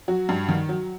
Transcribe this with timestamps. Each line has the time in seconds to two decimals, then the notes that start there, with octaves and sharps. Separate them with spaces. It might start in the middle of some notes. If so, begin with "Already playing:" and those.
0.08 F#3 F#4
0.29 G2
0.49 D#3
0.69 F#3